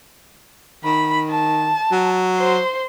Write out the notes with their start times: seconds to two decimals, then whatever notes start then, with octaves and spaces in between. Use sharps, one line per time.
0.85 D#3 B5
1.31 A5
1.91 F#3
2.37 C5 C6